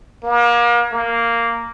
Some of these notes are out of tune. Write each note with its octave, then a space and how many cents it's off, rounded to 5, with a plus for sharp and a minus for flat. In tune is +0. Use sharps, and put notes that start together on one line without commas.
A#3 +35
A#3 -5